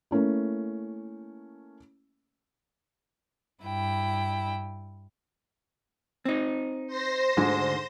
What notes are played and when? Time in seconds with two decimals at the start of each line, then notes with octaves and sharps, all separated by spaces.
0.11 A3 A#3 C#4 E4
3.63 G2 E4 G5
6.25 C4 D#4
6.87 C5 C6 A#6
7.37 D2 G#2 D3